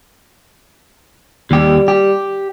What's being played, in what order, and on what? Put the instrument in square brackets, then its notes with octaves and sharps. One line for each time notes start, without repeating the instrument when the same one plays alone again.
[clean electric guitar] D#2 G4 [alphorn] G3
[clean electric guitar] G4